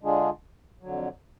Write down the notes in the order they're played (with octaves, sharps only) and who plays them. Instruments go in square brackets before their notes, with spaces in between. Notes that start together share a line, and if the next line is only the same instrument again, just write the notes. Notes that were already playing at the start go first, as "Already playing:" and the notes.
[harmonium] D3 G#3 D4 F4 G#4
F2 D3 F#3